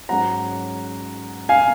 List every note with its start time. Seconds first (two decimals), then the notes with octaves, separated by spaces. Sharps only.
0.09 G#2 F#3 C#4 F#5 A#5
1.49 F5 G#5